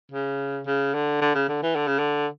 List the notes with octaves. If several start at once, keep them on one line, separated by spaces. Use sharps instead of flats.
C#3
C#3
D3
D3
C#3
D3
E3
D3
C#3
D3